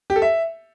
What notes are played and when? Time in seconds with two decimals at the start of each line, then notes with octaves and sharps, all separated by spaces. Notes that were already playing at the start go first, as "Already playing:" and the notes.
0.10 G4
0.16 A4
0.22 E5